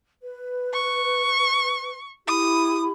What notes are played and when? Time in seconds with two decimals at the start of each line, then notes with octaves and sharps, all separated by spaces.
0.21 B4
0.73 C#6
2.27 E4 G4 B5 D#6